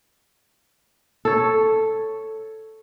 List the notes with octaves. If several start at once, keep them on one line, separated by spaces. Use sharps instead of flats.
A4 C#5